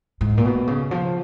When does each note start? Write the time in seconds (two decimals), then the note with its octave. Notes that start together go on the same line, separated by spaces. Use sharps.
0.21 G#2
0.37 A#2
0.45 B2
0.67 C#3
0.91 F3